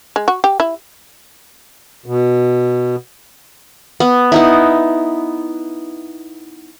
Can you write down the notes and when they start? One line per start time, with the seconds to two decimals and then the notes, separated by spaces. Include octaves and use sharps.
0.16 G#3
0.28 F#4
0.44 G4
0.60 E4
2.06 B2
4.00 B3
4.32 B3 D#4 E4